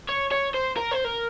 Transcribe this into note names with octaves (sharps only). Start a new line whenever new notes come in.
C#5
C#5
C5
A#4
C5
A#4